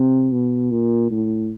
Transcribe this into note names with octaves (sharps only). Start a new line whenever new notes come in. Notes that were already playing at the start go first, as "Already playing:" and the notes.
Already playing: C3
B2
A#2
A2